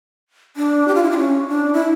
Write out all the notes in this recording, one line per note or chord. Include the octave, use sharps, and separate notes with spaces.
D4
G4
F4
E4
D4
C#4
D4
E4